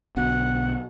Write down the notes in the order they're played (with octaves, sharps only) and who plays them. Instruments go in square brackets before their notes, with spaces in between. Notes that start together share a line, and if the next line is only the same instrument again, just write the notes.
[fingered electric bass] B1 B2 D3 [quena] F#5